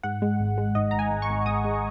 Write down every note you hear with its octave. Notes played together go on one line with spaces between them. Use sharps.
G#2 F#5
G#3
G#1
G#3
G#2 D#5
G#1 A#5
G#5
G#1
C#6
G#1
G#1 D#6
G#3